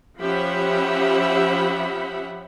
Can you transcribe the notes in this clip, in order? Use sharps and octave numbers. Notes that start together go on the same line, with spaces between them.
F3 C#4 G4 E5 F#5 B5